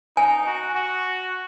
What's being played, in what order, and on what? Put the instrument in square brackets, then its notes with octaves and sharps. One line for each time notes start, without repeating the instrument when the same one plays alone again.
[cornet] D#4 [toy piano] G#5
[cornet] F#4
F#4